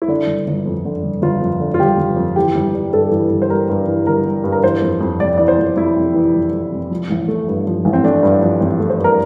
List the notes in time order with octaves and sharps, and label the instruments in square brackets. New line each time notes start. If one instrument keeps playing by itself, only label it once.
[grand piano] E4
D3 D4
G1
G1
F2
D3
G1
G1 F4
F2
D3
F4
G1 G4
G1
F2
E3 G4
G1
G3
G2 A4
E3
G1
C5
G3 A#4
G2
E3
G1 A#4
G3
G2
A#4
E3 C5
F2
F2
C3 D5
E3 D5
C5
F2
F2 E4
C3
E3
F2
F2
C3
F3
A1
A3
G2
F3
A1
C4
A3 D4
G2
F3
A1 C4
A3
C5
G2 A#4